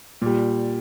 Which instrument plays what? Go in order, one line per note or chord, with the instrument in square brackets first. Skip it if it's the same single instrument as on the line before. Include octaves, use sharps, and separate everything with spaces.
[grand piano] A#2 G3